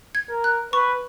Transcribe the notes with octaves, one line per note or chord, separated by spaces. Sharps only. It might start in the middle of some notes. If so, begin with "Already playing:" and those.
G#6
A#4
F#6
B4 C#6